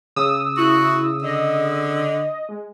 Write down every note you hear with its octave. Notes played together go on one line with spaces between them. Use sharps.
C#3 D#6 E6
E4 F#4
D3 D#5
G#3